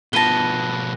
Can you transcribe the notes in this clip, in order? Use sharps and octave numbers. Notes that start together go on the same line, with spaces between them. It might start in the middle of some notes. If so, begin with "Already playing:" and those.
B2 F3 B4 A5 A#6 D#7 G7